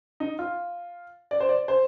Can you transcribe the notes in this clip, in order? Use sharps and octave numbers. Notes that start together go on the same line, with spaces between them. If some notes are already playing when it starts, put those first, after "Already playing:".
D#4
F4
D5
C5
D5
C5